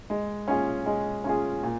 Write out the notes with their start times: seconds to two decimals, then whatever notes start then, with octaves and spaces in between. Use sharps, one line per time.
0.10 G#3
0.48 C#4 F4 G#4
0.86 G#3
1.24 C#4 F4 G#4
1.63 A#2